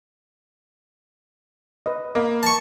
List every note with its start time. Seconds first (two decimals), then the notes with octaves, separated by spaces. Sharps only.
1.86 B4 D#5
2.15 A#3 D#5 B5
2.43 A5 C#6